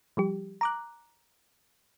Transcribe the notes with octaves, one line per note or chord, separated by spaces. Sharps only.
F3 G3 G4
A#5 D6 F#6